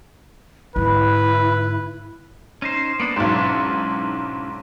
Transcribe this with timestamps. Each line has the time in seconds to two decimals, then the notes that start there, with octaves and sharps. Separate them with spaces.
0.76 G#2 D3 E4 B4
2.62 C#4 D#4 C5
3.00 A#3 B3 D4
3.16 B1 G#2 C#4 D4 E4